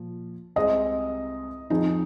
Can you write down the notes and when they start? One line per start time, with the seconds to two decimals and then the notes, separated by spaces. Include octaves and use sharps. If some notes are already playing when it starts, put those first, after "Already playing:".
Already playing: A#2 F3
0.56 C2 C3 G#3 C4 G#4 D#5
1.70 F2 F3 C4 D#4 G#4